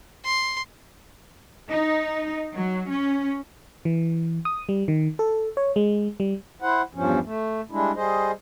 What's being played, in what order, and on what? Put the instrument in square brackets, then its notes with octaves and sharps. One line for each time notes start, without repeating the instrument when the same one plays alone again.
[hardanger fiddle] C6
[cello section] D#4
F#3
C#4
[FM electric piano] E3
D#6
G3
D#3
A4
C#5
G#3
G3
[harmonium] E4 C5 F#5
E2 G2 F3 C#4
A3
G3 G#3 D4 E4
G3 G#4 C5 D#5